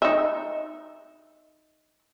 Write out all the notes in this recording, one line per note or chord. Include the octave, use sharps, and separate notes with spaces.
D#4 E5